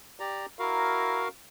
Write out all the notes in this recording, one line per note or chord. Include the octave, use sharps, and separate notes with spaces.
G4 D5 A#5
E4 F#4 A#4 F5 A#5